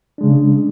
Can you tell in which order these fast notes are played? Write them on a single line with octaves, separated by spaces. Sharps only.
D4 G#3 C#3